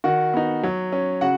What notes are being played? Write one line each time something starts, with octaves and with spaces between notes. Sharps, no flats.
D#3 F#4 F#5
B3 D#4
F#3
C#4
C#3 F#4 F#5